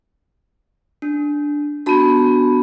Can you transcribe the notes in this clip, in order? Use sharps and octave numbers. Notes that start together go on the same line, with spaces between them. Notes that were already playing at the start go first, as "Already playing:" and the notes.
D4
B3 D4 F#4 A5 B5